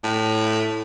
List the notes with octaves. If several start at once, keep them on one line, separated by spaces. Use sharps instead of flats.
A2